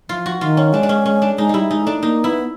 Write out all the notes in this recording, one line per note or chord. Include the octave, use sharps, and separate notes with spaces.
F3 F4
F#4
D#3 F4
C#4
G#3 D4
D4
C#4
C#4
D4
G#3 D#4
G3 D#4 E4
G#3 D#4
A3 D4
A#3 D#4
B3 E4